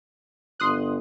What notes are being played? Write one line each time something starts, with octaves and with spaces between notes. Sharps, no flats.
G1 C6 D#6 F#6